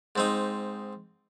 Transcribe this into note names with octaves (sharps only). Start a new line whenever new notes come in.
G#2 C4 D#4